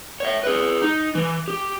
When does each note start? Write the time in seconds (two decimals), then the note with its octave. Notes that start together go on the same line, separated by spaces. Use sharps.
0.20 C#5 E5
0.44 G#4 B4
0.82 D#4
1.15 E3
1.48 G4